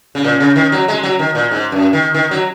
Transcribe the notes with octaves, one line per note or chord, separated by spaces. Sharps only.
C#3
A#2
C#3
D#3
F#3
G#3
F#3
D#3
A#2
G#2
F#2
D#3
D#3
F#3